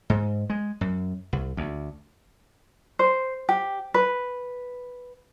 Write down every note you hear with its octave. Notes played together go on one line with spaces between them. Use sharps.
G#2
G#3
F#2
C2
D2
C5
G4
B4